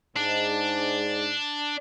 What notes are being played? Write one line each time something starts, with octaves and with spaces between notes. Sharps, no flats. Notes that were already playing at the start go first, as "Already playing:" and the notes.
G#2 D4